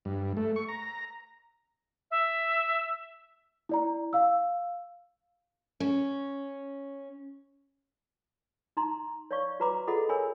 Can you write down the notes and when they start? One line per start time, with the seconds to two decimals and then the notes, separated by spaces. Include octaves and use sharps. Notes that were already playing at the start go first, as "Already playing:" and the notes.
0.05 G2
0.37 A3
0.56 C#6
0.68 A#5
2.11 E5
3.69 E4 D5 A#5
4.13 F5 E6
5.80 C#4
8.77 D#4 A#5 C6
9.31 C#5 D5 F5 C#6
9.60 F#4 B4 A#5 B5 D6
9.87 F4 G#4 A4 D#5 F#5 B5
10.09 A#4 C#5 G#5 B5